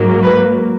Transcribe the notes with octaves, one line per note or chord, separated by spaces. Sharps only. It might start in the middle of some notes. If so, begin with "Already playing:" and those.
Already playing: G#2 F#3 A#3
B4